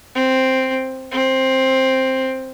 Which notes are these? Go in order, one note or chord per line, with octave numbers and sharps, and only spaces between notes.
C4
C4